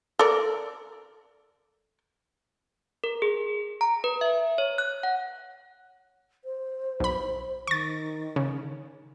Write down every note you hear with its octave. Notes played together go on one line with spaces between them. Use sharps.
A4 A#4 D5
A#4
G#4
A#5
B4
E5
C#5
F#6
F#5
C5
B1 B5
D#3 C#6 A6
C#3